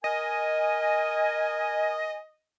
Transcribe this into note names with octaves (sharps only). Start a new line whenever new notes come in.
A#4 D#5 G#5